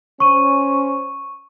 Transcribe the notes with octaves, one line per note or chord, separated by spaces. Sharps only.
C#4 C5 C#6 D#7